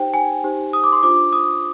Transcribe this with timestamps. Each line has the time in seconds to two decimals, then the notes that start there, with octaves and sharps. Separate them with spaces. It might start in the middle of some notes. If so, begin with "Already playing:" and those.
Already playing: D#4 G4 C5 G5
0.14 G#5
0.44 D#4 G4 C5
0.73 D#6
0.84 D6
0.92 C6
1.03 D4 F4 C5 D6
1.33 D#6